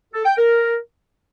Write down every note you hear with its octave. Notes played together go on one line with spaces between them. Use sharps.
A4
G5
A#4